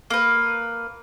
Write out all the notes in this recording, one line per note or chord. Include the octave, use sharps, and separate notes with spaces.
A#3 B4